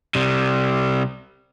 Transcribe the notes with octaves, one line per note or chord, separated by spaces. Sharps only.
C3 G3